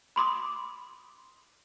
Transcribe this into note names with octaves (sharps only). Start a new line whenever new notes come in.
B5 C6 D6 D#6